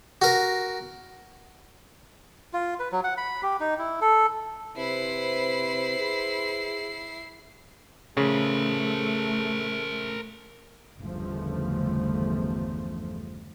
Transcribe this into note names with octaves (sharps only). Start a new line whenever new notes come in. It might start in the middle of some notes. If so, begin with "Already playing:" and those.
F#4 A#4
F4
B4
F#3
F#5
B5
G4
D#4
E4
A4
C3 E4 B4 C5 C7
G#4
C#3 A3 A#4 C5
G1 E2 C#3 F3 A3